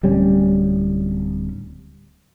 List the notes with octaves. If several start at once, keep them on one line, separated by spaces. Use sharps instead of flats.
D1 G3 C#4